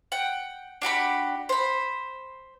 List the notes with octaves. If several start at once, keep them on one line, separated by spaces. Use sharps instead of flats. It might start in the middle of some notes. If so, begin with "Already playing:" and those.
F#5 G5
D4 F#4 G4 B5
C5 B5